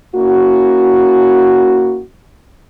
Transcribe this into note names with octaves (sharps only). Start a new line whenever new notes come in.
A#3 C#4 E4 F#4